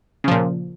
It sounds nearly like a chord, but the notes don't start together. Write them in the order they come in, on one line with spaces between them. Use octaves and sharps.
C#3 F3 A#2